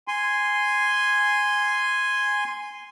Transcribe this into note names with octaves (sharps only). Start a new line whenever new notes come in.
G#5 C6